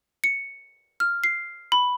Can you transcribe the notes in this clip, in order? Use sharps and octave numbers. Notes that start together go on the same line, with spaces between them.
C#7
F6
C7
B5